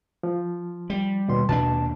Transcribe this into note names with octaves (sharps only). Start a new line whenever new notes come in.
F3
G3
D#2 B2 C6
D#2 B2 D4 A5